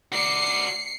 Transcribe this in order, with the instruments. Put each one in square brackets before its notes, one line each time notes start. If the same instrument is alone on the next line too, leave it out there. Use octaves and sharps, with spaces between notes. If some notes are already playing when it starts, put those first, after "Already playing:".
[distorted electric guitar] F#4 D5 [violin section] C7 C#7